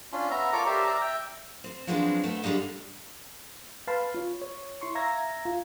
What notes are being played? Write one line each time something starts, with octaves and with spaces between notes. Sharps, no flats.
C#4 D4 F4
B3 E5 A#5
F4 A4 A#4 C#5 D5 D6
G4 A#4 C5 D5 E5
D5 E5 A#5
E5 G5
C4
F3 F#3 G#3 B3 C4 D4
A3 B3 A4
D3 G3 G#3 D#4 F5
B4 F5 A5 B5 C6
F4 C#5
C#5
E4 C6 C#6
E5 F5 A#5 E6 G#6 A#6
F4